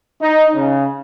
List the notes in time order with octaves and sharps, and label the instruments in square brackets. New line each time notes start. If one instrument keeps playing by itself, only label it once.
[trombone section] D#4
C#3